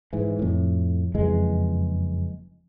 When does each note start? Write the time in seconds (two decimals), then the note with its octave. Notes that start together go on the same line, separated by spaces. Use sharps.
0.13 G#2 E3
0.39 F2 A2
1.14 F#1 F2 E3 G#3